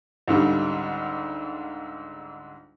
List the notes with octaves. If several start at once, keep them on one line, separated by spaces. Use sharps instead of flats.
C#2 G#2 D3 G3